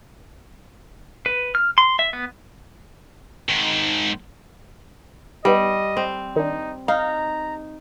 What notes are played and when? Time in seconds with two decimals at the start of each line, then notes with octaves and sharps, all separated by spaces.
1.26 B4
1.55 F6
1.78 C6
1.99 E5
2.13 B3
3.49 G#2 D#3
5.45 G3 B3 D#4 G4 D#5
5.97 C4
6.36 D#3 D4 D#4
6.88 D#4 F5 A#5